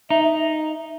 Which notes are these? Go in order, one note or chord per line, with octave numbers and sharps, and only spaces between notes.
D#4 E5
E5